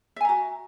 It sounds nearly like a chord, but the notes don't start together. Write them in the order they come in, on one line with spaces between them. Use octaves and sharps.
E5 G#5 A#5 F#4